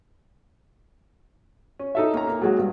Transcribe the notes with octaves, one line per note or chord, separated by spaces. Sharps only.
C#4
D#4 A4 E5
A#3 C#4 A#5
A#3
F#3 G#3 F#4
G2